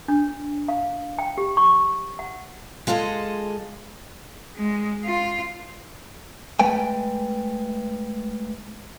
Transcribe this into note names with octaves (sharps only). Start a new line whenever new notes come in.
D4
F5
G5
G4
C#6
F#5
G#3 F4 G#4 A4 D#5
G#3
F4
G#3 A3 B4 G5 G#5